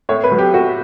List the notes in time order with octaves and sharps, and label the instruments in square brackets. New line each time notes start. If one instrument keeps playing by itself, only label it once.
[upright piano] A2 C#5
B4
F#3
G4
A2 F#4